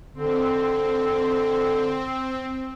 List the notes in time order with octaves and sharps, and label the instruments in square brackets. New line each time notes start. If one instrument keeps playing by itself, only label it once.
[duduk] D3 [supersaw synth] C4